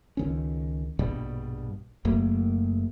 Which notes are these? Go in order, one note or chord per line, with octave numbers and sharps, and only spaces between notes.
C#2 D#3 C#4
A#1 G2 B2 G3
F#1 F#2 A3 A#3